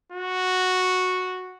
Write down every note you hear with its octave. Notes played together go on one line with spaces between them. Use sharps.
F#4